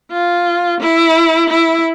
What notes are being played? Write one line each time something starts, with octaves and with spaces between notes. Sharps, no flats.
F4
E4
E4